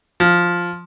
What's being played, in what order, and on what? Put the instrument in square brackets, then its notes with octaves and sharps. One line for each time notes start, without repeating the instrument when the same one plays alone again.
[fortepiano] F3